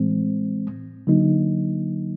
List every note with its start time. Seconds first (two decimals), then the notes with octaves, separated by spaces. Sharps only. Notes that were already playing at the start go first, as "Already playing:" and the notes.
Already playing: A2 E3 G#3 C4
1.07 D3 F#3 A#3 D#4